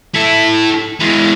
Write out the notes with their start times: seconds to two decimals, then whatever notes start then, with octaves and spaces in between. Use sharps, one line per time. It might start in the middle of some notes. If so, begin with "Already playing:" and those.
0.15 E4 A4
1.00 E3 G#3